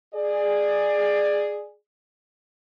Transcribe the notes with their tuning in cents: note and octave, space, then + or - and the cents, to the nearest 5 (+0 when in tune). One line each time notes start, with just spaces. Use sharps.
G#4 +0 D5 +20